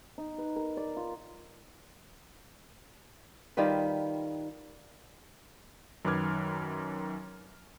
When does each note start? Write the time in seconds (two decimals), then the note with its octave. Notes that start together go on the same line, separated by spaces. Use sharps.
0.18 D#4
0.38 B4
0.56 A#4
0.77 D5
0.97 F4
3.57 D#3 G3 F4 B4
6.05 F#2 D#3 B4 D6 F6 G#6